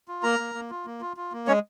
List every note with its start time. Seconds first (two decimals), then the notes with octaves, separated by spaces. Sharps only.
0.08 F4
0.23 A#3 A#4 A#5
0.39 A#3
0.55 A#3
0.70 F4
0.86 A#3
1.01 F4
1.17 F4
1.32 A#3
1.47 G#3 C#4 C#5